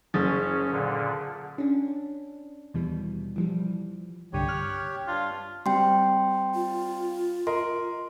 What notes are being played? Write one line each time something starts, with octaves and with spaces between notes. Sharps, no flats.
F#1 C#4 G#4 D#6 A6
A#2 D3
C#4 D4
D#2 B2 E3 G3
E3 F3 G3
C2 G2 D3 G4 C#5
F6 F#6
G2 D4 F4
G3 C4 G5 C6
F4
A#4 D#5 C6